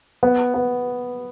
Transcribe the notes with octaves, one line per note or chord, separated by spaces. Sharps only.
B3
B3